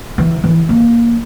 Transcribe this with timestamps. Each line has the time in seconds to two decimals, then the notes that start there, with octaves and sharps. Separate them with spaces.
0.18 E3
0.44 E3
0.69 A#3